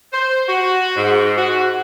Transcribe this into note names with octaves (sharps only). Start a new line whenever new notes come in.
C5
F#4
G#2
F#4